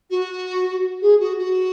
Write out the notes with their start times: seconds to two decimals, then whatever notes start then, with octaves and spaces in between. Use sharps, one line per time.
0.10 F#4
1.01 G#4
1.19 F#4
1.38 F#4